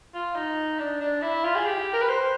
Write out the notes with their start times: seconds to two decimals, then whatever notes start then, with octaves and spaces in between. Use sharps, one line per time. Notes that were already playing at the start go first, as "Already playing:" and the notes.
0.14 F4
0.35 D#4
0.79 D4
1.01 D4
1.22 E4
1.45 F4
1.55 G#4
1.66 G4
1.93 A#4
2.01 B4
2.09 C5